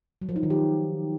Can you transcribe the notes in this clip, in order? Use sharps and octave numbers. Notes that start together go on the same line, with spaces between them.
F#3
F3
D#4
D#3
G4